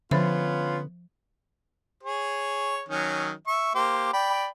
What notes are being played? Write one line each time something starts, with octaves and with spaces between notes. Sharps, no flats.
D3 F3 B3 C#4 F4 E5
G#4 C#5
D#3 F#3 C#4
E5 C#6
A#3 G4 C5
D5 G5 B5